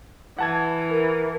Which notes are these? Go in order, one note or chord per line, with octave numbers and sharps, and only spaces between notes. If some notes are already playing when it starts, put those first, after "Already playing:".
E3 F#5 A5 G#6
A#4